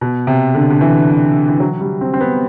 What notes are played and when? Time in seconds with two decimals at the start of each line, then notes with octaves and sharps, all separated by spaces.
0.01 B2
0.27 C3
0.55 D3
0.70 D3
0.81 E3
1.49 E3
1.60 F#3
1.81 G3
2.01 C4
2.14 C4
2.21 B3